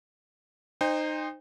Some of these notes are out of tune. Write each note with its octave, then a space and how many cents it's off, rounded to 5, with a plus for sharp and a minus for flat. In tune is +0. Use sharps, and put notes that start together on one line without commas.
D#4 -20 C5 +0 G5 +40